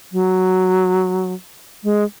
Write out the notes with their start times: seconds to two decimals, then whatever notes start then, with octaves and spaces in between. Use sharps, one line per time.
0.12 F#3
1.84 G#3